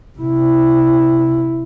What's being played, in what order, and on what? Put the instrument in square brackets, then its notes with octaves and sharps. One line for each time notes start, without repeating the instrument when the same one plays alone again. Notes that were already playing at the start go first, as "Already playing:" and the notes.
[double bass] C3 E4